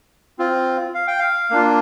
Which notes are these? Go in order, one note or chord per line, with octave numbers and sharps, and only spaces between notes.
C4 F4
F5
G5
F5
A#3 D4 F4